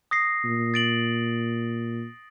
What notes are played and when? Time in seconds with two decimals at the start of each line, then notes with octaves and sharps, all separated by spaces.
0.11 D#6 A#6 C7
0.44 A#2
0.74 A6 D7 F#7